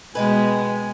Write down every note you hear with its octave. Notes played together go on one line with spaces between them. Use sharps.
B2 G#3 B3 B4 D#5 G5 G#5